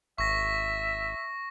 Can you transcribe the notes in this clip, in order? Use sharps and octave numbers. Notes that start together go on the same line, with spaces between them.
G#1 E5 C#6 A#6